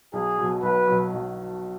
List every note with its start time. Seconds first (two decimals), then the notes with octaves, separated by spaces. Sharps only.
0.13 B1 G#4
0.38 B2 F#3
0.63 B1 B4
0.88 B2 F#3
1.13 B1